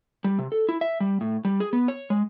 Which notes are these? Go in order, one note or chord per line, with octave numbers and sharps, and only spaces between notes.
G3
C3
A4
E4
E5
G3
A2
G3
G#4
B3
C#5
G#3